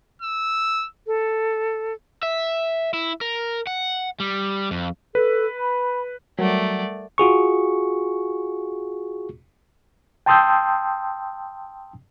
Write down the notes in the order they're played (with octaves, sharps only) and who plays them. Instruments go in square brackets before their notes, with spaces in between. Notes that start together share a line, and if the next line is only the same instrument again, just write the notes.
[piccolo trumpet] E6
[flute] A4
[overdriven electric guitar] E5
E4
A#4
F#5
G3
F2
[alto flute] A4 [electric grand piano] B4
[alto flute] B5
[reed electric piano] F#3 [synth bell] G3 A#4 F#5 [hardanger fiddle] A3 D5
[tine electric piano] F4 F#4 G#4 C#6
[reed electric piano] G5 A5 C6 D#6 E6 G6